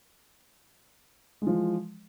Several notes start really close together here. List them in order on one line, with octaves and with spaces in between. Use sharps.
G#3 F3 E3